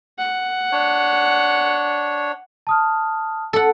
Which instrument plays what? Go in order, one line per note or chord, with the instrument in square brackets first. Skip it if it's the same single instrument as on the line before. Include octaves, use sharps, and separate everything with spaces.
[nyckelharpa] F#5
[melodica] D4 C#5
[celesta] A5 D#6 F6
[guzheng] A4 F#5